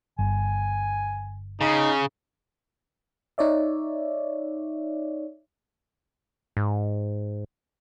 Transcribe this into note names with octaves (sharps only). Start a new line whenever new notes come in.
G1 G#5
C#3 D#4
D#4 C#5 D5 E5
G#2